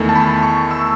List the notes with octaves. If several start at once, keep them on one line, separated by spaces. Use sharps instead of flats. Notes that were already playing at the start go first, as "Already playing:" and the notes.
Already playing: E2 D#3 A3
A5
B5
C#6
E6